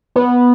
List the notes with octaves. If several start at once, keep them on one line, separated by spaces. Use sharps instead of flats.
B3